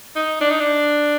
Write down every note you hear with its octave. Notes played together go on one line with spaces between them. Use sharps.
D#4
D4
D#4
D4